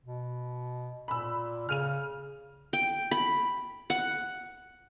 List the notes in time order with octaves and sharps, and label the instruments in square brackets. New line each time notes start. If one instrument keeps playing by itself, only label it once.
[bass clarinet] B2
[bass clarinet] A#2 [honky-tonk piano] B5 E6
[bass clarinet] C#3 [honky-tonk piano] F6 D#7 F7
[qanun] G5
B5
F#5